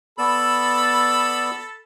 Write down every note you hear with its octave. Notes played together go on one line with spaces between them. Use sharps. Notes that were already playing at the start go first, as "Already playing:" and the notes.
B3 A4 D5 B5 E6